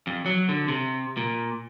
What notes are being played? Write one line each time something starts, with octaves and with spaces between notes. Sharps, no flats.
F2
F#3
D3
C3
A#2